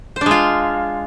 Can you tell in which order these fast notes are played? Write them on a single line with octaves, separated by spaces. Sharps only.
C5 D4 G#3 F4